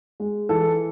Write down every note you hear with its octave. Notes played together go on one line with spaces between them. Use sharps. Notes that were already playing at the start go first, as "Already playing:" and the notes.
G#3
E3 A4